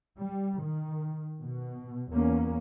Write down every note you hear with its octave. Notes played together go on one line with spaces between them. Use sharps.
G3
D#3
B2
E2 A#3 C#4